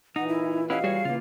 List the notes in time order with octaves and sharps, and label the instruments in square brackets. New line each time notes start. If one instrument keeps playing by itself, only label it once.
[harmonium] A#2 E3 [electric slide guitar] D#4 [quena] F#5
[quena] E4
[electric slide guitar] C#4 E4 B4 [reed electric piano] G4 D#5 F#5 [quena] F5
[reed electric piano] G3 [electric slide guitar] F#4 G#4 C#5
[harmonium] A2 E3 [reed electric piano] C#3 [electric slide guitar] A#3 F4